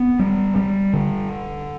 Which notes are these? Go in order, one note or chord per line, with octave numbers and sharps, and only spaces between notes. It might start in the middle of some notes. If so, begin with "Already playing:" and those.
Already playing: B3
G3
G3
D3